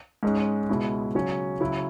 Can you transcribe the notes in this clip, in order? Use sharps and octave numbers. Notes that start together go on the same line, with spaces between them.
G#2 G#3 C#4
C#2 B2 G#3 E4
C#3 F#3 C#4
C#3 F#3 E4